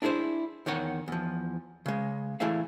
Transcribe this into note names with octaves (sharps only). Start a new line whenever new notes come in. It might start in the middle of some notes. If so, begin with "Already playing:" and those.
D4 E4 G#4 A4 C5
E2 D#3 C#5 F#5
E2 F3
C#3 G#3
E3 A3 E4 G#4 E5 F5